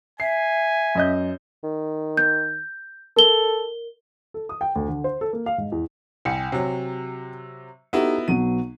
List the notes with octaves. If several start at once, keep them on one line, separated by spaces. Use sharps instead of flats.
E5 G#5 C7
F#2 D#5 G6
D#3
G6
A4 A#4 G7
A4
D#6
G5
D2
D3
C5
A4
A#3
F5
G#2
E2
C2 G5 G#5 C#7
C3 F#3
B3 D#4 E4 F#4 G4 A4
B1 F#3 B3 D#7